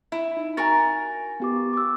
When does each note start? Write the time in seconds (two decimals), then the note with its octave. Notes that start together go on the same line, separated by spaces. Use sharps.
0.12 E4 E5
0.37 D#4
0.57 F#4 A#4 G#5 A#5 A6
1.40 B3 G4 D6
1.73 D6 E6